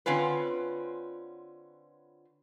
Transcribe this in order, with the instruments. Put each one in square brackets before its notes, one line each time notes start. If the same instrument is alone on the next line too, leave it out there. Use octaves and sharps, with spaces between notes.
[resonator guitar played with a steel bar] D3 C4 C#4 F4 B4